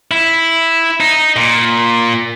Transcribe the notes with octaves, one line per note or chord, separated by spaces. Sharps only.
E4
D#4
A#2